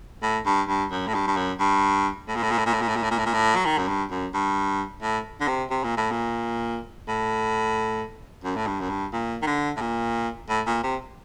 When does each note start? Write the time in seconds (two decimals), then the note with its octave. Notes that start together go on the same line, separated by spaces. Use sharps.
0.23 A2
0.46 G2
0.69 G2
0.92 F#2
1.08 A2
1.15 G2
1.27 G2
1.37 F#2
1.60 G2
2.28 A2
2.36 A#2
2.44 A2
2.51 A#2
2.58 A2
2.66 A#2
2.74 A2
2.82 A#2
2.89 A2
2.96 A#2
3.03 A2
3.11 A#2
3.19 A2
3.26 A#2
3.34 A2
3.56 F#3
3.66 D#3
3.78 F#2
3.88 G2
4.11 F#2
4.34 G2
5.02 A2
5.41 D3
5.48 C3
5.71 C3
5.84 A#2
5.97 A2
6.11 A#2
7.08 A2
8.44 F#2
8.56 A2
8.67 G2
8.81 F#2
8.90 G2
9.13 A#2
9.42 D#3
9.47 D3
9.77 A2
9.81 A#2
10.50 A2
10.67 A#2
10.84 C3